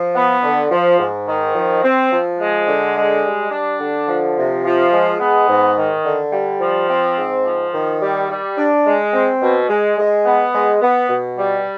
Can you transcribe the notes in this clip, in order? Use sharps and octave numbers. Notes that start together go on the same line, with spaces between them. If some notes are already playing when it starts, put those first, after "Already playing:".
Already playing: F3
B3
D3
F3
G#2
D#3
F3
C4
F3
G#3
D3
G#3
G3
D4
D3
F3
C3
F3
G#3
B3
G#2
D#3
D3
G3
F3
C4
G#2
F3
D#3
G3
G3
D4
G#3
C4
B2
G#3
G#3
B3
G#3
B3
B2
G3